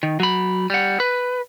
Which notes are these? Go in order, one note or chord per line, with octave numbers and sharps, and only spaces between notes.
D#3
F#3 B5
G3 F#5
B4